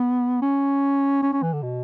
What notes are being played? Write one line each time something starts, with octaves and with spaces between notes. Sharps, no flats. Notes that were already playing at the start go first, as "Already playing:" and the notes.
Already playing: B3
C#4
C#4
C#4
E3
D3
B2